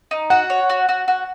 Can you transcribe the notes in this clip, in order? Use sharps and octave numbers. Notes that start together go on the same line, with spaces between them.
D#4
F#4 F#5
C#5
F#4
F#4
F#4